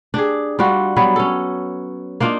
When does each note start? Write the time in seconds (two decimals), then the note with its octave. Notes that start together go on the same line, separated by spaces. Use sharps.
0.14 D4 G4 G#4
0.59 G3 D4 F4 F#4
0.96 F#3 G3 B3 B4
1.16 C#4 A4
2.20 A#3 D4 D#4 F4